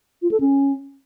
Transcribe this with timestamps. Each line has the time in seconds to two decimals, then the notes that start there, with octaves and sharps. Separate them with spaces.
0.22 F4
0.31 A4
0.40 C#4